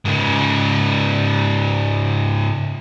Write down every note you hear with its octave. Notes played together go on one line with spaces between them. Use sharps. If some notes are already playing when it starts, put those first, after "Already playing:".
G#2 C#3